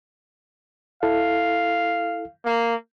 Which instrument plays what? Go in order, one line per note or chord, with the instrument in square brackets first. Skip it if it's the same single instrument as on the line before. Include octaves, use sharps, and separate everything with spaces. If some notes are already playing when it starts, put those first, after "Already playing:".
[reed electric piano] E4 A4 [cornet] F5
[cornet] A#3